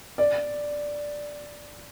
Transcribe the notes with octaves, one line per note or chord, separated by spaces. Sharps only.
D5